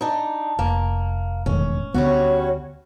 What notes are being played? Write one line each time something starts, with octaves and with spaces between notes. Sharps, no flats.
D4 D#4
F1 A#3
E1 A2 D#3 C#4
D2 G3 B3 C#4 F#4 C#5